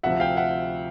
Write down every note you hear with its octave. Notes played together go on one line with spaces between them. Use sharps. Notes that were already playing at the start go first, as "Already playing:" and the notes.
D2 C3 F3 E5 F#5
F5 G5
E5 F#5